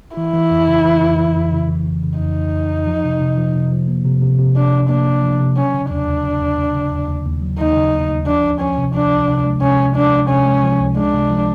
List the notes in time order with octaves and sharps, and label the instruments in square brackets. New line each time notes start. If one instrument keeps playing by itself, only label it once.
[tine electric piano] E3 [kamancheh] E4
[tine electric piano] E3
F2
C#3
E3
F2
E3
F2
C#3
E3
E3
C#3
[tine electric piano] F2 [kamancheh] D#4
[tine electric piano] F2
F2
F2
F3
C3
C3
F3
C3
F3
A#3
C3
C3
C3
[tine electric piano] C3 [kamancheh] D4
[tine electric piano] C3
[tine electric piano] A#3 [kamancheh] D4
[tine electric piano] A#3
F3
C3
[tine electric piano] F#3 [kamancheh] C#4
[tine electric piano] C#3
[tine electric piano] D#2 [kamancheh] D4
[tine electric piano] D#2
C#3
D#2
D#2
C#3
D#2
D#2
D#2
F#3
[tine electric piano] D#2 [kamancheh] D#4
[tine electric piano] C#3
D#2
D#2
[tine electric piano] F3 [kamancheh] D4
[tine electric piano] C#2
[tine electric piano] F3 [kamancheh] C#4
[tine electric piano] C3
[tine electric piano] F3 [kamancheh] D4
[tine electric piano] C#2
C3
G#3
[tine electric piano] C3 [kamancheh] C#4
[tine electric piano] G#3
[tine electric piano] F3 [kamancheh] D4
[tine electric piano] G#3
[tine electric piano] C3 [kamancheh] C#4
[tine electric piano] G#3
F3
C#2
[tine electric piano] G#3 [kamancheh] D4
[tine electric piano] C3
F3